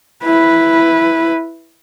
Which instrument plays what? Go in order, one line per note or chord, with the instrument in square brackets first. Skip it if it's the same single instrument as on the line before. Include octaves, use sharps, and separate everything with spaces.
[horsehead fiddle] E4 B4